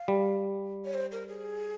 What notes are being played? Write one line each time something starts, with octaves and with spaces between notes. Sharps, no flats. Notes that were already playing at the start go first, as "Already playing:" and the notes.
Already playing: F5
G3
C#5
C5
A#4
G#4